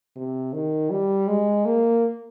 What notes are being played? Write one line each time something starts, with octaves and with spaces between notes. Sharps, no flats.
C3
D#3
G3
G#3
A#3